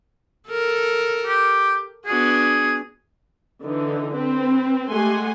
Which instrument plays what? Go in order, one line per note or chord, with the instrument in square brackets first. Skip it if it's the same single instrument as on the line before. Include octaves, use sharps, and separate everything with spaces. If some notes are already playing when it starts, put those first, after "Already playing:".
[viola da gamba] A4 A#4
[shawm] G4
[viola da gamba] B3 D4 F#4 [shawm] G#4
[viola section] D3 E3 D#4
C4 B4
G#3 A3 G4 F#5 G#5 C6